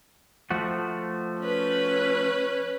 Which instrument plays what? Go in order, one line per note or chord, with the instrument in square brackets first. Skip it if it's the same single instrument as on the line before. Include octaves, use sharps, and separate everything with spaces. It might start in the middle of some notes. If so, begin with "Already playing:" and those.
[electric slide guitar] F3 A3 F#4
[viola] C#4 B4